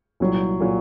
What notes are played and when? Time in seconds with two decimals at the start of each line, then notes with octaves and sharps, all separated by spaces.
0.20 C2 A#2 F#3
0.60 A#2 F#3